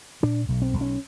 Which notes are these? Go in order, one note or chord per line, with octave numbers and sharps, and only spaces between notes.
A#2 D4
B1
C4
B1
C#4